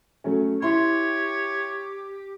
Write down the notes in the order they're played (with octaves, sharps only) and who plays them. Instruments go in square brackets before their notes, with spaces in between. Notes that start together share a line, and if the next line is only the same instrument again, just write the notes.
[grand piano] F#3 A3 C#4
[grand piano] E4 C6 [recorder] G4 [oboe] C#5